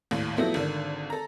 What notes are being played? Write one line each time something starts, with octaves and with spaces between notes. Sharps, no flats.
G#1 D#2 A2
F3 F#3 A3 B3 E4
G#1 D3 D#3
A4 A#5